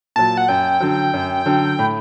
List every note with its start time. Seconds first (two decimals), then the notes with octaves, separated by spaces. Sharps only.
0.16 A#2 F#3 A5
0.37 F#5
0.48 F#2 G5
0.81 D3 F#3
1.14 F#2
1.46 D3 F#3
1.79 A2